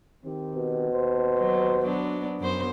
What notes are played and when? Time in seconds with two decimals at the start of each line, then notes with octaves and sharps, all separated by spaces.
0.25 D#3 C4 G4
0.55 B2
0.93 D#2 C5
1.38 F#3
1.83 F#3 B3 D4
2.40 F#2 B3 C5